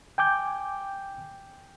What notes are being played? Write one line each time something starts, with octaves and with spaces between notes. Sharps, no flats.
G5 G#5 D6 G6